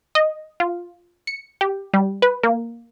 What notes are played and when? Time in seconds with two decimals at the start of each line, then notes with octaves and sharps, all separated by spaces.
0.15 D#5
0.60 F4
1.27 C#7
1.61 G4
1.94 G3
2.22 B4
2.43 A#3